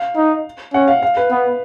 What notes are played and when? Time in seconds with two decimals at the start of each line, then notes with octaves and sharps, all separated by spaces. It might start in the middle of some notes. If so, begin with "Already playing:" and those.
Already playing: F5
0.16 D#4
0.74 C#4 F#5
0.88 F5
1.02 F5
1.17 B4
1.31 B3